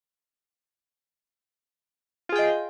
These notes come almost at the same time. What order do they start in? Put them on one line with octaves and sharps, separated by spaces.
F4 G#4 G5 D#5